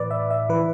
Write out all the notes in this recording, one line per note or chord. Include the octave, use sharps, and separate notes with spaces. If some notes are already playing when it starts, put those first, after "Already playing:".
Already playing: A2 E3 B4 D5
E5
E5
E3 B4